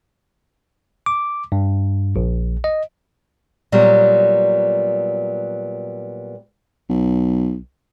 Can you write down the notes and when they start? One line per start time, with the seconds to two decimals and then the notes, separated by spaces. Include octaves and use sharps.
1.06 D6
1.52 G2
2.16 A#1
2.64 D#5
3.72 A#2 F#3 G3 B3
6.89 B1